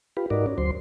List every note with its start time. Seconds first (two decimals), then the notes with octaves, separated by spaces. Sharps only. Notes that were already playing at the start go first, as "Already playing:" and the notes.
0.17 F4 G4 B4
0.30 G#2 D#4 F#4 A#4 D5
0.46 C#4
0.58 D2 F#3 C5 C6